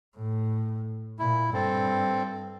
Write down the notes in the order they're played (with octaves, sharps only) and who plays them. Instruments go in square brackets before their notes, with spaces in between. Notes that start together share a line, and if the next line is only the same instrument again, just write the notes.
[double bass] A2
[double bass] A#2 [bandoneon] E4
[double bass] G2 [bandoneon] C4 A4